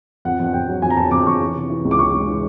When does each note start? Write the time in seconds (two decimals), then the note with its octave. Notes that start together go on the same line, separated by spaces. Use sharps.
0.25 F2 F#5
0.40 F2 F#5
0.53 F2 G5
0.68 F#3
0.82 F2 G#5
0.90 A#5
0.97 F2 A5
1.11 F2 D6
1.27 F2 C#6
1.41 E3
1.55 C3
1.70 E3
1.85 C#2
1.91 D6
1.99 E3 C#6
2.13 G#3
2.28 E3